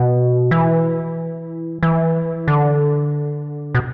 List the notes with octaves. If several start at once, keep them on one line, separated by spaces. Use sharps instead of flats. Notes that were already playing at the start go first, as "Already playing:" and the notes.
Already playing: B2
E3
E3
D3
B2